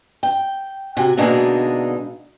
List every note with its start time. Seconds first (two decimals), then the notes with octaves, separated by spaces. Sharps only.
0.23 G5
0.97 C3 F#4 G#5
1.17 B2 D3 G#3 A#3 D4 D#4